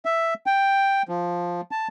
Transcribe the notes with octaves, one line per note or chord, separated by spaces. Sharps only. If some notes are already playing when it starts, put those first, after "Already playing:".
E5
G5
F3
A5